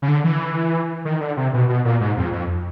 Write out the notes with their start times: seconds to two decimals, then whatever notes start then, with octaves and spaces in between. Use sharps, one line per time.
0.02 C#3
0.08 D3
0.24 E3
1.05 D#3
1.21 D3
1.37 C3
1.54 B2
1.69 B2
1.85 A#2
2.01 G#2
2.17 F2
2.33 F2